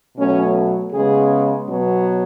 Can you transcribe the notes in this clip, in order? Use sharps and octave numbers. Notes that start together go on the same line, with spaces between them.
B2 F#3 A3 C#4
C#3 G#3 B3 G#4
B2 F#3 B3